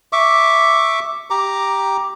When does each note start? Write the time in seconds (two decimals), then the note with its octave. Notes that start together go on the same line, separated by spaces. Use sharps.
0.13 E5 C#6 D6
1.30 G4 A#5 D6